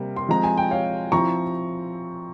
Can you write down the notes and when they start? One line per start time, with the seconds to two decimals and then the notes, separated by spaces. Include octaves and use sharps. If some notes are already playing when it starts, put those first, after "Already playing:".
Already playing: C3 G3 A#3
0.16 C6
0.29 F3 G#3 C4 A#5
0.44 G#5
0.57 G5
0.71 C#5 F5
1.12 F3 C4 E4 A#5 C#6